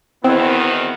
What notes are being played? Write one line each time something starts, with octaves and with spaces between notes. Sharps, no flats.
E2 B2 D#3 B3 C4 E4